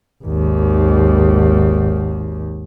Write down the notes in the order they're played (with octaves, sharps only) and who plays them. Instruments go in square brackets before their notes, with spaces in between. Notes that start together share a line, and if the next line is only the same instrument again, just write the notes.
[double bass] G#1 D#2